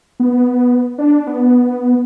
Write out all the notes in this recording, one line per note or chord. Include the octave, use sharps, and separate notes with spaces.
B3
D4
B3